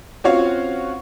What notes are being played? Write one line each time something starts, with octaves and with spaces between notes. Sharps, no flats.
C4 C#4 F4 F#4 C#5 F5